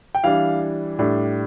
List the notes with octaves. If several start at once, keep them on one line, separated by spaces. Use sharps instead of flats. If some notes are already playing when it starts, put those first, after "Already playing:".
G5
E3 G3 D4 F5
A2 G3 D4